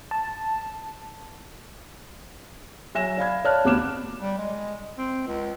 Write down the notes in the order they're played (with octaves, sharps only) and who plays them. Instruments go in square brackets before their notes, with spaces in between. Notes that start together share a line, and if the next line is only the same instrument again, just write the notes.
[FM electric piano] A5
[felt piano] F#3 E5 G#5 A#6 E7
D5 F5 B5 G#6
C#5 D5 F5 A5 F6 F#6
D2 C3 B3 D6 F#6 E7
[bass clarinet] G3
G#3
C4
C#2